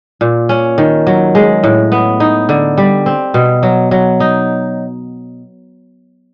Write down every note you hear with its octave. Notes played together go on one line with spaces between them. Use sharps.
A#2
C#4
D#3
F#3
G#3
A2
B3
D#4
D3
G3
C4
B2
F#3
F#3
D#4